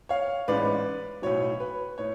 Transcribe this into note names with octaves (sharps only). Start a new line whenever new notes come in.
C#5 F5
A1 G#2 G#3 C#4 B4 D5
B1 A2 F#3 C#5
B4
A2 C#5